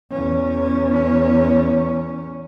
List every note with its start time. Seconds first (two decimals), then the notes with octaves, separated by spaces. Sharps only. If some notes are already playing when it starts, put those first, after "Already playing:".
0.11 E2 C#4